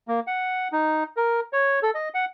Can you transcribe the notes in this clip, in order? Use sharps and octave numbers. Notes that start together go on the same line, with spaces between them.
A#3
F#5
D#4
A#4
C#5
A4
D#5
F#5